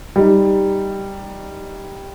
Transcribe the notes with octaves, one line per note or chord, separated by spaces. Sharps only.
G3 D#4